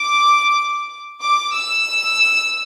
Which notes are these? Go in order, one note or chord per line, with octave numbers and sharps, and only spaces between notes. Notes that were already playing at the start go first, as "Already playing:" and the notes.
Already playing: D6
D6
E6